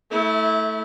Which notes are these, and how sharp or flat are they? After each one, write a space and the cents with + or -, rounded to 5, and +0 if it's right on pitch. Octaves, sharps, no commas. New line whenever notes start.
A3 +0 E4 -25